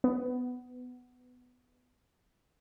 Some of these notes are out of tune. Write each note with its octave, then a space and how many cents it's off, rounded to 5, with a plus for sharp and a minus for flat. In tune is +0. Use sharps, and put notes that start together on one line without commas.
B3 +10